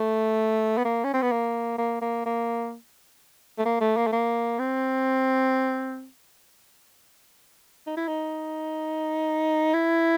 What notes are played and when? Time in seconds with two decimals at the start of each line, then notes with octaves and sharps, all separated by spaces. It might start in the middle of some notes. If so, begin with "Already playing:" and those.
Already playing: A3
0.77 B3
0.85 A#3
1.04 C#4
1.14 C4
1.22 B3
1.31 A#3
1.78 A#3
2.01 A#3
2.26 A#3
3.59 A3
3.65 A#3
3.81 A3
3.97 A#3
4.07 A3
4.12 A#3
4.59 C4
7.87 D#4
7.97 E4
8.08 D#4
9.74 E4